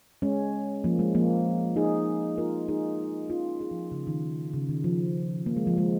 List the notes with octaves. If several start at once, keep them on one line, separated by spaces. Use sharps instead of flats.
G#3 C#4
F3 A#3
G#3
F3 A#3
D#4 G#4
F4 A#4
D#4 G#4
C#4 F4
D#4 G#4
F3
C#3
D#3
C#3
D#3
F3
A#3
G#3
F3
G#3